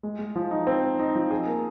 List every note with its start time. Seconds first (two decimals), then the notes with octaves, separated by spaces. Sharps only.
0.03 G#3
0.19 G#3
0.36 F3
0.51 D#4
0.67 C4
0.84 D#4
0.99 D#4
1.15 F3
1.31 G#4
1.47 A#3